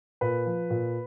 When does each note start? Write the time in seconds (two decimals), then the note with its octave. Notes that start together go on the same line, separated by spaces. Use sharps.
0.21 A#2 B4
0.46 F3
0.70 A#2